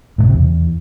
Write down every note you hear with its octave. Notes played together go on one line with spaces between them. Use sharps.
G#2
B2
C3
E2